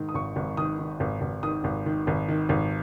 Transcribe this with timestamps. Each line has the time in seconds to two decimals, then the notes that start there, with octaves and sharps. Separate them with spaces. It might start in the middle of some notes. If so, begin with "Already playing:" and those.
Already playing: G#2 D#3
0.09 D#6
0.14 G#1 C#6
0.36 G#1
0.57 D#3 D#6
0.79 D#3
1.00 G#1
1.21 G#1
1.43 D#3 D#6
1.64 G#1
1.86 D#3
2.07 G#1
2.28 D#3
2.49 G#1